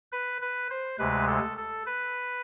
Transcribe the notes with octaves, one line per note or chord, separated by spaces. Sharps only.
B4
B4
C5
D2 C3 G#3 B4
A4
A4
B4